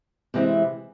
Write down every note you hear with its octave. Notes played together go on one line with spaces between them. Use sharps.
C3 E3 G#3 C4 E4